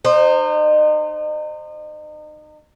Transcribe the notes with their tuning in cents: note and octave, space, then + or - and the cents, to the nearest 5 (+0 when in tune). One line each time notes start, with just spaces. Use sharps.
D#4 -35 C5 +0